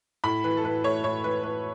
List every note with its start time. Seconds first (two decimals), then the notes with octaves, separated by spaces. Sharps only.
0.24 A2 B5
0.44 E3 B4
0.57 A4
0.64 A2 B4
0.84 A3 C#5
1.04 A2 C#5
1.24 E3 B4
1.43 A2 B4